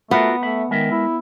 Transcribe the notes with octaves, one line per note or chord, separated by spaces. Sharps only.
A3 B3 F4 F#4 A#4
A3 E5 B5
D#3 G#3 A#4 E5
E4